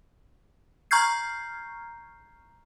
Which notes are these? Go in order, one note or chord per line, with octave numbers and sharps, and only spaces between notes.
A#5 C#6 F6 G6 G#6 C7